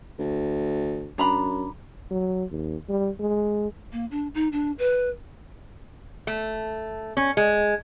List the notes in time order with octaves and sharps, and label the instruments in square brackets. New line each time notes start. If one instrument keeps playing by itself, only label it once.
[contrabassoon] D2
[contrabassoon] F#2 [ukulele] D4 A#5 B5
[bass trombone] F#3
D#2
G3
G#3
[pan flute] A#3
D4
D#4
D4
B4
[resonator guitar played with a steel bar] A3
C#4
G#3